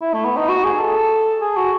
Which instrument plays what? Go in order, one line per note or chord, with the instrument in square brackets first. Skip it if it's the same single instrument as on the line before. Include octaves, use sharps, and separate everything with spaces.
[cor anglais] E4
A3
B3
D#4
F#4
G#4
A4
G#4
F#4